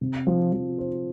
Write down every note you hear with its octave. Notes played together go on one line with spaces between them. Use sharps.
C3
F3
F3
C5